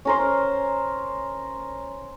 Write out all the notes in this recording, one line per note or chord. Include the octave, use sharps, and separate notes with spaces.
C#4 A#4 C5